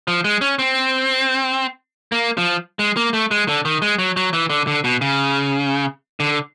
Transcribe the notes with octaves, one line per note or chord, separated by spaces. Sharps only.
F3
G#3
C#4
C4
A#3
F3
G#3
A#3
A3
G#3
D3
D#3
G#3
F#3
F#3
E3
D3
D3
B2
C#3
D3